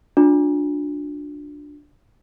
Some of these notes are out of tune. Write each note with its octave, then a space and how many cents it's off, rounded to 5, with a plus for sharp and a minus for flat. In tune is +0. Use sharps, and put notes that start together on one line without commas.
D4 +0 F4 +45